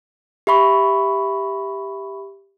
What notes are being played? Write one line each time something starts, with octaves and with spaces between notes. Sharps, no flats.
G4 E5 B5 C#6